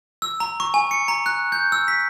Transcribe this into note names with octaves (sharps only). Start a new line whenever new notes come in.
E6
A#5
C#6
G#5
C#7
A#5
F#6
G6
E6
B6